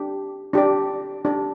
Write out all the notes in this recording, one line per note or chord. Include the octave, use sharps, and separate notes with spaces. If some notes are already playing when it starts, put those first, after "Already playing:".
Already playing: D4 G4
D4 G4 D5
D4 G4 D5